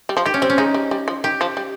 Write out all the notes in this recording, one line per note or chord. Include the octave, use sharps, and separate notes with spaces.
G3
F3
D#3 G4
C#4
G3 C4
C#4
G#3 D#4
G3
G3
F3
D#3 G4
F3
G3